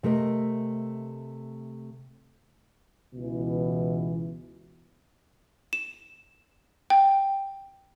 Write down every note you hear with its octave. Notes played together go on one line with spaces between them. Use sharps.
C3 A3 A#4 D#5
C#2 B2 E3
E7
G5